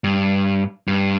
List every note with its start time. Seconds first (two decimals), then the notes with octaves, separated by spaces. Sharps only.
0.04 G2
0.88 G2